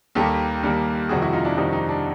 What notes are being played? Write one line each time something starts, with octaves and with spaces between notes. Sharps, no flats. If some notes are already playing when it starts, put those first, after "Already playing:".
D#2 D#3 G3 A#3 G4 A4
D#2 D#3 G3 A#3
F2 C3 D#3 G3 F#4 G#4
E4 F#4
D#4 F4
D4 E4
F2 C3 D#3 G3 D#4
D#4
D4